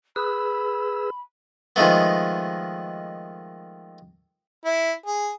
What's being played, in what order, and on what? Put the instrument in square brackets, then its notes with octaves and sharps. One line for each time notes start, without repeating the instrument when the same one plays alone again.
[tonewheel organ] G#4 B4 E6 [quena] B5
[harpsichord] D#3 F3 G#3 A3 B3
[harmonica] E4
G#4